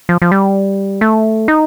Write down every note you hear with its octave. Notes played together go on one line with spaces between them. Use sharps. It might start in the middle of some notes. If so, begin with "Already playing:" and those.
F3
F3
G3
A3
D#4